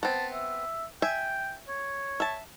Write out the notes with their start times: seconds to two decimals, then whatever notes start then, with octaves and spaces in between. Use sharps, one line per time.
0.03 B3 C4 A5
0.33 E5
1.02 E5 G5 G#5
1.68 C#5
2.20 E5 A5